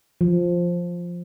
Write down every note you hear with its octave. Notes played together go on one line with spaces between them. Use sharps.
F3